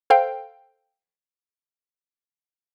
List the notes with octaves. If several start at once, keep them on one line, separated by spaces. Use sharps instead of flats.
A4 C5 F5 G5